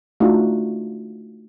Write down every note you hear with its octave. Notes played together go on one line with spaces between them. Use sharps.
A3 D4 D#4 F4 F#4